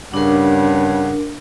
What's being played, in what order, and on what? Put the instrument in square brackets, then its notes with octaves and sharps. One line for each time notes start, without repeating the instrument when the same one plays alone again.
[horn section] G2 C#3 F#5 [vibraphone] D4 A#4